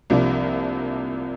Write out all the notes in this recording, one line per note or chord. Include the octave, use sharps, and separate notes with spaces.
C2 C3 F3 A#3 D4